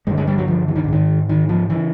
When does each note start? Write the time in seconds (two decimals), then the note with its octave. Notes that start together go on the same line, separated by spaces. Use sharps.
0.07 G2 D3 G#3
0.17 G#3
0.27 G3
0.38 F#3
0.48 F3
0.68 E3
0.76 D#3
0.84 D3
0.88 G#2 D#3
1.29 D#3
1.49 F3
1.69 C#3 E3